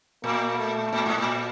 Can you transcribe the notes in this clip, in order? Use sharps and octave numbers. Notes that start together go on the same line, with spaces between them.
A#2 A#3
A3
A#2
A2
A#2